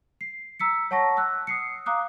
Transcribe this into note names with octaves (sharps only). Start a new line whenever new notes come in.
C7
A#5 E6 B6 C#7
C#5 F#5 A5 C#6 A#6
E6 F#6
D#6 C7 C#7
F5 A#5 D6 D#6 F#6